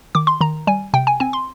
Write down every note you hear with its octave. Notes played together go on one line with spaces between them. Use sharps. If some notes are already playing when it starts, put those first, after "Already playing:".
D#3 D6
C6
D#3 A#5
G3 G#5
C3 G5
G#5
C4 G#5
C6